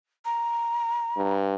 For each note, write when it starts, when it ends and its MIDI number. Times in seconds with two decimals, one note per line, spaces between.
0.25 1.34 82
1.16 1.55 43